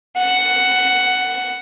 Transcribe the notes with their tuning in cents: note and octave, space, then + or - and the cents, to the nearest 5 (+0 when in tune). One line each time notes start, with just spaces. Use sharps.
F#5 +5